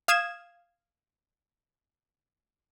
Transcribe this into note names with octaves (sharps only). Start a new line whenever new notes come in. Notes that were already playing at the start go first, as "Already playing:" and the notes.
F5 D#6 G#6 E7